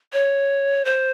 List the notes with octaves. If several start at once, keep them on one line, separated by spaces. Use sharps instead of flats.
C#5
C5